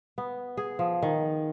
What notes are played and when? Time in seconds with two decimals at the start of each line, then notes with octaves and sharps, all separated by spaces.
0.18 B3
0.57 G#4
0.79 F3
1.02 D#3